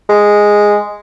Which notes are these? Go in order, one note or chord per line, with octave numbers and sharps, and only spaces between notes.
G#3